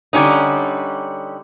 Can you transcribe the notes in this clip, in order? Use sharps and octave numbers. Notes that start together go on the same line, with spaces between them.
D3 G3 C#4 D#4